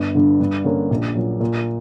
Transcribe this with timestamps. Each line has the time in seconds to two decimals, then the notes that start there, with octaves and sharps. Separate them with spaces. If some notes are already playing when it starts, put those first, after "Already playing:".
Already playing: G1
0.15 G2 D3
0.40 G2
0.64 D3 A#3 C#4
0.91 A#1
1.15 A#2 F#3
1.40 A#2